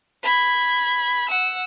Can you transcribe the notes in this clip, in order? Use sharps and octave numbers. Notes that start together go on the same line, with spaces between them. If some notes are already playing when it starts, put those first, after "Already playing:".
B5 G#6
F#5 E6